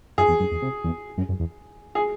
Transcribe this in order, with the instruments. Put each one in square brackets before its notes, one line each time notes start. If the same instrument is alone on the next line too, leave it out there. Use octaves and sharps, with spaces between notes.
[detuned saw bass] F#2 [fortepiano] G#4
[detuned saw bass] E2
F#2
E2
C3
E2
F#2
F#2
E2
[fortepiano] G#4